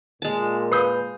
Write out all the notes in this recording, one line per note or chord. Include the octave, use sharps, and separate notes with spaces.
A#2 G#3 A5
B4 F5 D#6 G6 C7